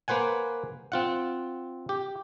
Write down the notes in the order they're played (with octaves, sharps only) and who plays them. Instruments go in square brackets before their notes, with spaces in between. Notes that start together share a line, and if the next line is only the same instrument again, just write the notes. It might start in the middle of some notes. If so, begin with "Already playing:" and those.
[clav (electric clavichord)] A#3 B4 C5 F#5 G#5
C4 F4 F#5
G4